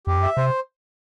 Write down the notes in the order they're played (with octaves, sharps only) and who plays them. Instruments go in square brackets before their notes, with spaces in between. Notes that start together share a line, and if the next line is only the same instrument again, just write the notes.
[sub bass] F2 [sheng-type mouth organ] G4
[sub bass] F#2
[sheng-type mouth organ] E5
[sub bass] C3 [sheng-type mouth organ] C5